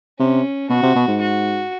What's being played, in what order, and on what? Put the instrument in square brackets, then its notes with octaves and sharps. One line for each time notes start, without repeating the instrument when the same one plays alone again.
[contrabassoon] C3 [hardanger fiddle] C#4
[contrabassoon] B2 [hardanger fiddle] F#4
[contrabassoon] C3
B2
G#2
[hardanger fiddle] F#4